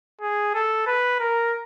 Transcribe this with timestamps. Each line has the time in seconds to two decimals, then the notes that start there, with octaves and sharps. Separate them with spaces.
0.22 G#4
0.55 A4
0.87 B4
1.20 A#4